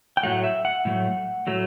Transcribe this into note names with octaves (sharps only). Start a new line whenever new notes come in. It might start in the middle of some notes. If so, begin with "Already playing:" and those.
G5
A2 F#3 A3 F#5
E5
F#5
A2 F#3 A3
A2 F#3 A3